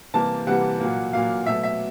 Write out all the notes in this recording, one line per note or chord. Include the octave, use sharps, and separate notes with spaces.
C3 E3 G3 A#3 A5
C3 E3 G3 A#3 F#5
A#2 F#3 A#3
A#2 F#3 A#3 F5
B2 F#3 A3 E5
E5